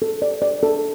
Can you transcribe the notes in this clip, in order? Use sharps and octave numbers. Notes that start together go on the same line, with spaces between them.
A4
D5
D5
A4